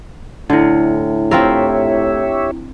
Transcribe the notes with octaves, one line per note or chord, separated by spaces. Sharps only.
A2 D3 D4 E4
C4 F4 G4 A#4 C#5 E5